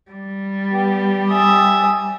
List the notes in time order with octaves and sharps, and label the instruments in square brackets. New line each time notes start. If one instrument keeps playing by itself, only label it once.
[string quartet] G3
[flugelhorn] B3 [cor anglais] G4
[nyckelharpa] E5 D#6 [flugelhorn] G#5